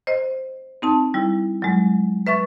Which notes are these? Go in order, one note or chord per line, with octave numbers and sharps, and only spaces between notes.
C5 D#5
C4 D#4 A5
G3 E4
F#3 G#3
B4 E5 C#6 A6